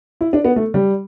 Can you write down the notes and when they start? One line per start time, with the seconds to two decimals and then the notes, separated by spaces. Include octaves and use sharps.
0.21 E4
0.33 D4
0.45 B3
0.56 A3
0.74 G3